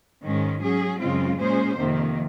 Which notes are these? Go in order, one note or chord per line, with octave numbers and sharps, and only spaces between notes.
G#2 D#3 G#3 C#4
F#3 C#4 G#4
F#2 C#3 G#3 C4 F4
A#2 G#3 C#4 G#4 C5
F2 C3 D#3 A#3